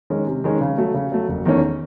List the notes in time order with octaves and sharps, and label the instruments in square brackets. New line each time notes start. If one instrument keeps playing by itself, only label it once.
[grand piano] D#3 G#3 C#4
C3
D#3 G#3 C#4
C#3
F#3 A3
C#3
F#3 A3
F#1
E2 D#3 A3 C#4